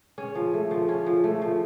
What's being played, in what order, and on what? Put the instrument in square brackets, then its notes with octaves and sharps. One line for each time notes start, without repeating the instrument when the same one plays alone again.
[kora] C#4 [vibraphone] G#4
[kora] F3
A3
F3
C#4
F3
A3
F3